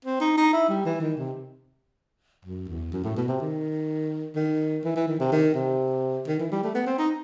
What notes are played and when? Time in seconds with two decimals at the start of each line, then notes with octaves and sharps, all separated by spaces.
0.05 C4
0.20 D#4
0.37 D#4
0.53 E4
0.69 G3
0.85 E3
1.01 D#3
1.17 C3
2.45 F#2
2.68 E2
2.93 F#2
3.04 A2
3.17 B2
3.28 C3
3.41 D#3
4.35 D#3
4.84 E3
4.96 E3
5.08 D#3
5.20 C3
5.32 D#3
5.55 C3
6.27 D#3
6.39 E3
6.52 G3
6.63 A3
6.75 B3
6.86 C4
6.99 D#4